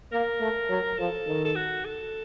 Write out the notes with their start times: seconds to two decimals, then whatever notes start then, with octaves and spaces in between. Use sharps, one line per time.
0.12 A#3 A#4
0.41 A3
0.70 F#3
0.99 F3 A4
1.27 D#3
1.45 A4
1.56 F#4
1.85 A4